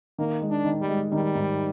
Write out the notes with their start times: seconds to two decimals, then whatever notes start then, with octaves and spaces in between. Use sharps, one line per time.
0.18 D#3 A#3
0.42 G#3
0.49 D4
0.65 D#3
0.81 G3
0.88 G#3
1.12 D#3 G3
1.35 G#2